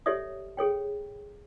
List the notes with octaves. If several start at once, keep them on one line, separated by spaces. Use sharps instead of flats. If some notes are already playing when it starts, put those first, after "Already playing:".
G4 A4 C#5 D5 E5 D#6
G#4 A4 C#5 G5